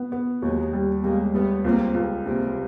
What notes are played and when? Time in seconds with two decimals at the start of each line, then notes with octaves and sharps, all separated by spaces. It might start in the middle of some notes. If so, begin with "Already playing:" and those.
Already playing: B3
0.12 B3
0.42 D#2 F#3 G#3
0.73 G3
1.03 G3 G#3 A#3
1.34 G3 A3 B3
1.64 C#2 A#3 C4
1.94 C#2
2.25 C3 A#3 C4